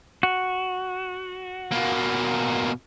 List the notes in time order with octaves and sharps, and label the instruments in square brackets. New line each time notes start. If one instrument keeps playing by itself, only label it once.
[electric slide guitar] F#4
[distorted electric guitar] B2 A#3